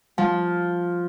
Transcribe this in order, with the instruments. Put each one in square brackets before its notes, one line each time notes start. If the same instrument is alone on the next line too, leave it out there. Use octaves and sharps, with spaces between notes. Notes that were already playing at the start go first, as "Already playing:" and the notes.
[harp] F3